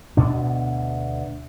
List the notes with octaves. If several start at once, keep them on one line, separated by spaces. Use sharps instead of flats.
D2 B2 D4